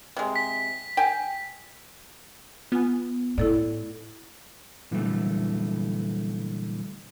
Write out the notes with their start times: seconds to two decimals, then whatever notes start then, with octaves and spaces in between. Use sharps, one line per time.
0.17 C3 G#3
0.36 B6
0.97 G5 G#5
2.72 B3 F4 G#5
3.38 A2 E4 A4 D5
4.91 A#2 D3 E3 F#3 G3 A3